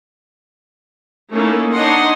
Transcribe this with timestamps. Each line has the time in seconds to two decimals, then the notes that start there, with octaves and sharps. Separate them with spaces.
1.30 A3 A#3 C#4 D#4 E4
1.72 D4 D#4 C#5 D#5 F#5 C6